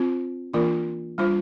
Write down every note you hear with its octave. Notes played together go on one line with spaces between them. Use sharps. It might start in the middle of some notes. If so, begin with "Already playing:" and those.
Already playing: C4 F4 C5
E3 A#3 D4 F4 A#4
G3 D4 F4 C5